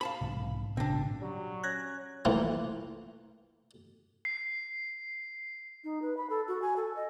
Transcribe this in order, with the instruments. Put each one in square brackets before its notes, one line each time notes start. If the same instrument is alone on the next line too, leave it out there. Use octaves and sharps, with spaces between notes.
[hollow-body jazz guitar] F5 A5 B5
[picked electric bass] B1 G#2 C3
[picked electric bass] G#1 A#2 C#3 [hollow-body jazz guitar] C4 D4
[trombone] F#3 [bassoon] G3
[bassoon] C#4 [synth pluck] F#6 G#6 A#6
[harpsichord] E3 F3 A3 A#3 C4
[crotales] C7
[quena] D#4
B4
B5
A4
F#4
G#5
A4
D#5